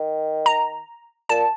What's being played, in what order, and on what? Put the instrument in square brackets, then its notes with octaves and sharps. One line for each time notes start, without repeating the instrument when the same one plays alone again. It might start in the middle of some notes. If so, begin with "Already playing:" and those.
Already playing: [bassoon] D#3
[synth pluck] A#5
[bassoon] A#2 [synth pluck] A5